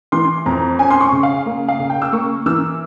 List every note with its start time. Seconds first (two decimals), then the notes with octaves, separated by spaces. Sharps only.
0.12 E3 C6
0.46 F2 A#5
0.78 C#4 G#5
0.90 C6
1.01 C#6
1.12 C#3
1.23 F5
1.46 A#3
1.68 F5
1.79 C#3
1.90 G5
2.02 E6
2.12 A#3 C#6
2.46 E3 E6